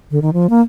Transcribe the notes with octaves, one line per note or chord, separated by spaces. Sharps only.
D3
D#3
F3
A#3